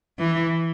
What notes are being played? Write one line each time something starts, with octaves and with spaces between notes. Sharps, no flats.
E3